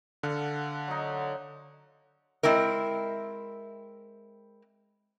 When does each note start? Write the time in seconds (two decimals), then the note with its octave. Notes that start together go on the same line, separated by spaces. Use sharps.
0.23 D3 A4 F5 F#5
0.88 F#3 D#4
2.43 G#3 C4 E4 A#4